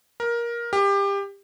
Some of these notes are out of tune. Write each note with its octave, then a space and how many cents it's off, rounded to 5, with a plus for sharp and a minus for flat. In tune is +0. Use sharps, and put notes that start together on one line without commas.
A#4 +15
G4 +25